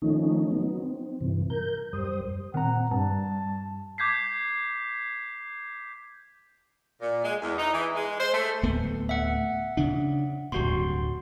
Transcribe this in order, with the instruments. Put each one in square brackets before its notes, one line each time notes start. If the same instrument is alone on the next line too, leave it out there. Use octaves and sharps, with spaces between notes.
[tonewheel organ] D#3 F3 A3 C#4 D#4
F#3 B3 D#4
C4
G2 C3 E3
A#4 G6
F#2 G3 C5 D#6
[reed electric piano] A#2 C4 A#5 [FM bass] D#3 [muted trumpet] F#5
[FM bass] G2 [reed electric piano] G3 [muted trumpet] A5
[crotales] D6 G6 G#6 B6 C7
[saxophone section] A#2
G#3
E2
D#4
E3
G#3
C5
A3
[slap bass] D1 A3 B3
[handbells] E5 F#5
[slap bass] C#3 D4
[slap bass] D1 G2 [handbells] F#4 C6